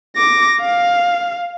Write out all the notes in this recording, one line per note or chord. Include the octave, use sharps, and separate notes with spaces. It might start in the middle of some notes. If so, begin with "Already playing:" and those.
D6 A#6
F5